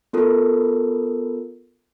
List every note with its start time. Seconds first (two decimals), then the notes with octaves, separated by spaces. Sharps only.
0.13 B3 F4 A4 A#4